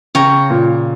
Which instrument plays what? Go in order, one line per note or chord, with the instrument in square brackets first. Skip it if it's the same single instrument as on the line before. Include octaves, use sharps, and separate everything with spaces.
[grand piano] C#3 [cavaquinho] C#5 G5 A#5
[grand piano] A#2